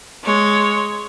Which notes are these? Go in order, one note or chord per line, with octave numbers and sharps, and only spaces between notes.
G#3 C#5